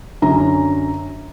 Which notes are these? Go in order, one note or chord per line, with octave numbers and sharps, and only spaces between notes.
F#2 D3 C#4 A#5